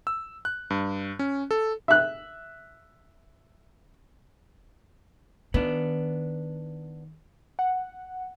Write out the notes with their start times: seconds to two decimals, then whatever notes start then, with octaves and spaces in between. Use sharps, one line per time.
0.07 E6
0.45 F#6
0.70 G2
1.19 C#4
1.51 A4
1.88 E5 F#6
5.54 D#3 B3 D4
7.59 F#5